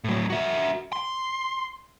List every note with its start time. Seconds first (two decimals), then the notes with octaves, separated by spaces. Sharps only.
0.04 A2 F#3
0.30 F#4 E5
0.93 C6